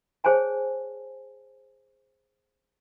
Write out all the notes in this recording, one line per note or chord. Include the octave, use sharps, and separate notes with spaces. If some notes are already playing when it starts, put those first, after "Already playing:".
G#4 C5 C#5 G#5 A5